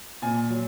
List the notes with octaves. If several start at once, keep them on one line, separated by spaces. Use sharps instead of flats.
A#2 G#5
F#3